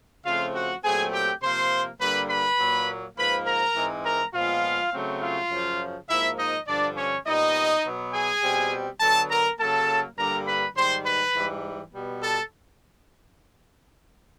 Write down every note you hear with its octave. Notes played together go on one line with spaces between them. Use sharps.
C#3 F3 A3 C4 F4 F5
F#4 F#5
A#2 F#3 A3 C4 G#4 G#5
G4 G5
C3 F3 A#3 C5 C6
G2 D3 G3 A#3 B4 B5
B4 B5
A#2 F#3 A#3
G#2 F3 A#3 B4 B5
A#4 A#5
G#2 E3 G#3 C4
A#4 A#5
A#2 F3 G#3 B3 F4 F5
C#3 F#3 A3 C4
F4 F5
F#2 C#3 F3
G#2 F3 A#3 E4 E5
D#4 D#5
G2 D3 F3 D4 D5
C#4 C#5
A#2 G3 B3 D#4 D#5
B2 F#3 B3
G#4 G#5
B2 G3 C4
D3 F#3 B3 A4 A5
A#4 A#5
C#3 F#3 A#3 A4 A5
G2 D3 G3 A#3 A#4 A#5
B4 B5
G#2 D#3 G3 C5 C6
B4 B5
G#2 E3 G3
B2 G3 B3
A4 A5